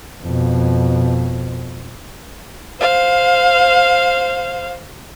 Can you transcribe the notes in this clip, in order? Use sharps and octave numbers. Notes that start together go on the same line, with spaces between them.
F2 B2
C5 F5